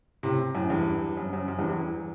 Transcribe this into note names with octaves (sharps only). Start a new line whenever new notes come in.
A2 C3
F#2 A2
E2 G2
F#2
F#2
F#2
E2 G2
E2